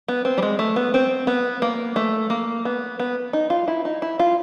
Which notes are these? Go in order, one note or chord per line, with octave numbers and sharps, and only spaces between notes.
B3
C4
G3
G#3
A3
B3
C4
B3
A#3
A3
A#3
B3
B3
D#4
F4
E4
D#4
E4
F4